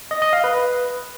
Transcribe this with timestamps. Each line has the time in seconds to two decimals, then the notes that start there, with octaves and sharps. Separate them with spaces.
0.11 D#5
0.22 D#5
0.33 F5
0.44 B4